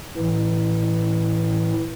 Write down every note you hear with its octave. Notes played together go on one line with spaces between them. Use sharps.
A2 E3